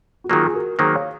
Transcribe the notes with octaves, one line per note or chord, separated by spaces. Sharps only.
F#4
D#3 F#3 A#3 F4 G#4
G#4
F#4 A#4
D#3 F#3 A#3 G#4 C5
C#5 F5